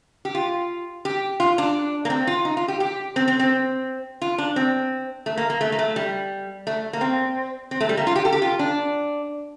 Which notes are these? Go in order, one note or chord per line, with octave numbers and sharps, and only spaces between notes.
G4
F4
G4
F4
D4
A#3
C4
F4
D#4
F4
G4
G4
C4
C4
C4
F4
D4
C4
A3
A#3
A#3
A3
A#3
A3
G3
A3
A#3
C4
C4
A3
G3
A#3
F4
G4
A4
G4
F4
D4